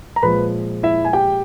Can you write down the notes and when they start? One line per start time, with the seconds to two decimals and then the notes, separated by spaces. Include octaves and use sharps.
0.16 A#5
0.23 A#2 F3 G#3 B4 B5
0.83 E4 E5
1.05 G#5
1.13 G4 G5